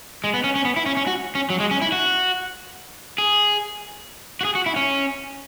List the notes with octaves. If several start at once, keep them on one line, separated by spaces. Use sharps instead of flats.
G#3
B3
C#4
C#4
B3
E4
C#4
C#4
F#4
C#4
F#3
G#3
C#4
E4
F#4
G#4
F#4
G#4
F#4
E4
C#4